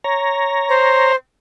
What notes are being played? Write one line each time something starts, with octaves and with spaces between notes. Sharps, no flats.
C#5 A#5
C5